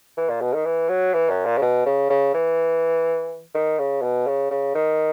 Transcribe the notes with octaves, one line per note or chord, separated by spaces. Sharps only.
E3
A#2
B2
D#3
E3
F#3
E3
F#2
A#2
C#3
B2
C#3
C#3
E3
D#3
C#3
B2
C#3
C#3
D#3